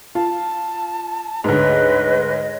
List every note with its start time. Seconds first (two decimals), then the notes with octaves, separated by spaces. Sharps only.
0.15 F4 A5
1.44 D2 G#2 B4 C#5 D#5